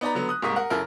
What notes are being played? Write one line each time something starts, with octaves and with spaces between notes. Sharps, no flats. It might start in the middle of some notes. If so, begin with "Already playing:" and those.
B3 D#4 D5 A#5 B5
D3 F#3 B3
D#6 F#6
C2 G#2 A#3 C#6 D#6 B6
A#4 F#5
F#2 C#3 E4 A4 A#4 F6